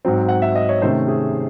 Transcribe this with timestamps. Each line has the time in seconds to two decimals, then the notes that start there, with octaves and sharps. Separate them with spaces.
0.05 G#2 F#3 C4
0.29 F#5
0.42 E5
0.56 D#5
0.69 C#5
0.82 C3 D#3 A3 C#4 C5
1.08 G#4